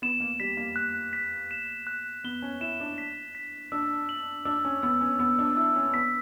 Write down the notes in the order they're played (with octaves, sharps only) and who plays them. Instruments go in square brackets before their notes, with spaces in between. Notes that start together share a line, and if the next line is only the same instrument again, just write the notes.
[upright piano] B3 [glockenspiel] E7
[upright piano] A#3
[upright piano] G3 [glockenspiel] B6
[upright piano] A#3
[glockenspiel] F#6
B6
E7
F#6
[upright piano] B3 [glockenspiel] G7
[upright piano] C#4
[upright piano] E4 [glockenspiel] E7
[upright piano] D4
[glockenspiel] B6
B6
[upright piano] D4 [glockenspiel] E6
[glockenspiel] F#7
[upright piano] D4 [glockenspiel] E6
[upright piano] C#4
[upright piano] B3 [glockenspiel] E6
[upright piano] C#4
[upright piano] B3 [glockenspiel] E6
[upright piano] D4
[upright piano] E4 [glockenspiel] E6
[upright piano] C#4
[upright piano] B3 [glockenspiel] B6